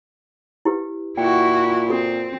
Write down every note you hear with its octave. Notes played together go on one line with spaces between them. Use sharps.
E4 G4 B4
A#2 E4 F#4 G5
C4 F#4 A4